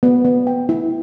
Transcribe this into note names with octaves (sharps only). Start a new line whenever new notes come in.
B3
B3
G5
E4